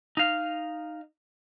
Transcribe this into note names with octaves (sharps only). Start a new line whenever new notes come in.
D#4 F5